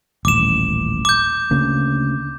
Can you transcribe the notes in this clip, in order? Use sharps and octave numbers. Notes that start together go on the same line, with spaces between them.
D#1 A1 D6 E7
D6 G6
D2 C#3 A#3